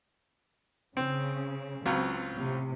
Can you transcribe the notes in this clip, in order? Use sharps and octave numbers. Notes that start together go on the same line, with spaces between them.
C#3 C4
C#2 F#3 C4 F4
A2 C3